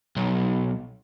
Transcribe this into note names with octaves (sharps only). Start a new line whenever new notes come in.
B1